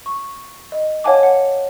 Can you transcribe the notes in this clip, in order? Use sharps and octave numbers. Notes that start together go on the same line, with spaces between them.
C#6
D#5
C#5 F5 F#5 G#5 A5 D6
F#5